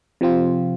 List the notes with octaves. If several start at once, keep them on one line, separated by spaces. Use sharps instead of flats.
C3 F3 C4 F4